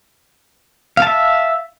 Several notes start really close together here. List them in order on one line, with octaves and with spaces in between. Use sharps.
F5 A5 E5